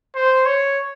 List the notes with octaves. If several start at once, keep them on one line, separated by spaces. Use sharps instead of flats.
C5
C#5